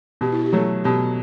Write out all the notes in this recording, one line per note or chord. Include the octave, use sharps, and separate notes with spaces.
B2 G4
E4
F#4
G4
F#3 A3 A4
B2 G4